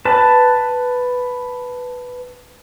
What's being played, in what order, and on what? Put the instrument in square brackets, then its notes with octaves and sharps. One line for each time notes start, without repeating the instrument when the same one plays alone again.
[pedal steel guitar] B4 A5